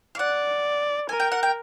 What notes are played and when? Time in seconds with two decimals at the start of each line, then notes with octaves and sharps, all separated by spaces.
0.15 F5
0.19 D5 F#5
1.09 A#4 G#5
1.20 G5
1.32 F#5
1.43 G5